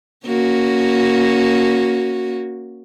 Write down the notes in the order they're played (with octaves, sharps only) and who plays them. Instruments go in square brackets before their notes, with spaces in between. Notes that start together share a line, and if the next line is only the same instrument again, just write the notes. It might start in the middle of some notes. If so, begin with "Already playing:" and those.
[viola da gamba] A#3 C#4 F#4